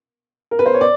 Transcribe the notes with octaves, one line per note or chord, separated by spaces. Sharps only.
A#4
B4
C5
C#5
D5